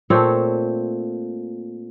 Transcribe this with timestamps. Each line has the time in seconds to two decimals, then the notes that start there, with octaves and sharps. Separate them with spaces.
0.10 A#2 A3 C4 C#5